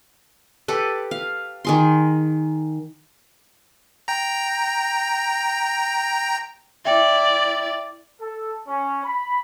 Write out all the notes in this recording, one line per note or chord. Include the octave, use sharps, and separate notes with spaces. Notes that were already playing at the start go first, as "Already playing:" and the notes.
G4 A4 B4
F5
D#3 G#4 C6
G5 A#5
E4 D5 E5 G5
A4
C#4
B5